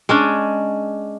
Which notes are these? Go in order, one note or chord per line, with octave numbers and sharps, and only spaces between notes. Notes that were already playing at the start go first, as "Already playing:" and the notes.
G#3 C#4 D4